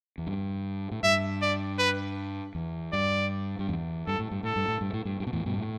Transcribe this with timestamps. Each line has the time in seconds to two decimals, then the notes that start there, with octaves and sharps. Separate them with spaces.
0.18 E2
0.27 G2
0.91 A2
1.03 G2 E5
1.42 D5
1.78 B4
2.55 E2
2.93 G2 D5
3.59 G2
3.69 E2
4.07 G2 A4
4.19 A2
4.31 G2
4.43 A2 A4
4.56 G2
4.68 A2
4.81 G2
4.93 A2
5.05 G2
5.20 G2
5.27 B2
5.33 E2 A2
5.46 G2 B2
5.58 A2